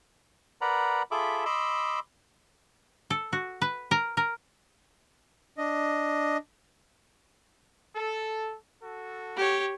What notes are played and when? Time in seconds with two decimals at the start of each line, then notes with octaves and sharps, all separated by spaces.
0.61 A#4 B4 D5 F#5 A#5 B5
1.11 F4 G#4 A4 E5 B5 D6
1.45 D#5 B5 C6 D6 E6
3.10 A4
3.33 F#4
3.62 B4
3.91 A#4
4.17 A#4
5.58 D4 D#5
7.96 A4
8.82 F#4 A4
9.36 G4 C#5